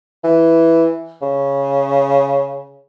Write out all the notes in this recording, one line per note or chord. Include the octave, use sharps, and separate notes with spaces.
E3
C#3